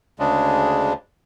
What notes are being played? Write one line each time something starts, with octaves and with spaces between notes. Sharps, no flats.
D2 C#3 G#3 D4